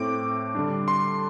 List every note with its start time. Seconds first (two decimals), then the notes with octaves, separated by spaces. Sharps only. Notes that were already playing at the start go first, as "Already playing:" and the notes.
Already playing: A2 A3 C4 D6
0.55 D3 G3 D4
0.88 C6